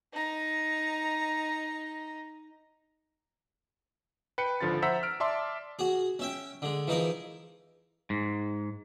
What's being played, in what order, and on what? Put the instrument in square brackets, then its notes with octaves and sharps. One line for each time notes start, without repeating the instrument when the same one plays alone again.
[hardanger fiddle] D#4 A#5
[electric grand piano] B4 G5 C#7
G#1 D3 F3 F4 B5 A6
C5 E5 F#5 A#5 E6 B6
F6 D7
D5 E5 A5 C6 D6 E6
[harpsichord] F#4 G#4
C#4 E5 G5
D3 G#3
E3 F3 D#4 G#4 A#4
[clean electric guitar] G#2